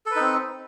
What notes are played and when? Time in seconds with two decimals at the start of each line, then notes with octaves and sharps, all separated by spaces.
0.06 A4
0.11 B4
0.16 D#4
0.21 C4